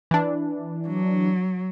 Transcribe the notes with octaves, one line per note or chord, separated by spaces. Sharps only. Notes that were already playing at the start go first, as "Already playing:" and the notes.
E3 D4
F#3